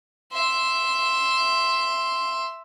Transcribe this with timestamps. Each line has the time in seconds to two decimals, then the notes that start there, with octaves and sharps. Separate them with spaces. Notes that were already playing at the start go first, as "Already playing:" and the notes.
0.32 E5 C6